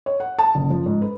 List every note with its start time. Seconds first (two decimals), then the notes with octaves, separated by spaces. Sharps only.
0.06 C#5
0.20 F#5
0.39 A5
0.55 F#1
0.70 F3
0.86 G#2
1.02 B4